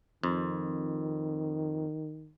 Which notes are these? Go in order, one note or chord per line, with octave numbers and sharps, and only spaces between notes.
F2 D#3